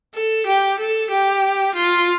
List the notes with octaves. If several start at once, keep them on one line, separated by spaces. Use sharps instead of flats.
A4
G4
A4
G4
F4